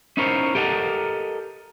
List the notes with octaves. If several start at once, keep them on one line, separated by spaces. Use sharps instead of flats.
C#4 D#4 E4 A#4 C5 C#5
G4 A4 A#4 D#5 F#5